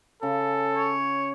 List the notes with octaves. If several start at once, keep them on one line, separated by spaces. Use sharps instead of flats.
C#3 A4
C#5